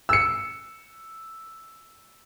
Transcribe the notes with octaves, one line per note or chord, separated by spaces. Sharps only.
E6 C#7